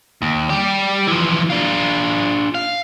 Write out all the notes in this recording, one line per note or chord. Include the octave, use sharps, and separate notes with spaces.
D#2
G3 G4
E3 F3
D4 F4
F5